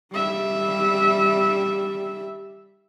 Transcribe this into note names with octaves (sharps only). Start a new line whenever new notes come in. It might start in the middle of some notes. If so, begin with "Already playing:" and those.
G3 E5